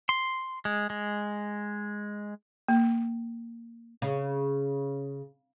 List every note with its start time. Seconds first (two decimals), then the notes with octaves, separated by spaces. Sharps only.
0.09 C6
0.65 G#3
0.90 G#3
2.68 A#3
4.02 C#3